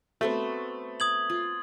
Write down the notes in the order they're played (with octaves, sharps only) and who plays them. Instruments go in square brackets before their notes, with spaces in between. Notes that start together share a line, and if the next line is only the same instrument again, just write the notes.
[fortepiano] A3 [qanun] B3 C4 F#4
[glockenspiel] D#6 G#6 F#7
[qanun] F4